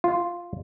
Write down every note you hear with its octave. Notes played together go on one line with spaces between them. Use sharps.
F4